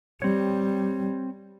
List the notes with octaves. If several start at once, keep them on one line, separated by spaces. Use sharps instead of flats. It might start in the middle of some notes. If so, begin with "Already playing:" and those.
G3 C4 C#5